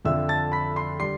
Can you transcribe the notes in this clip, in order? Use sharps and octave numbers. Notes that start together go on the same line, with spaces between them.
F2 D3 F3 E5 E6
A5 A6
B5 B6
C6 C7
D3 G3 C6 C7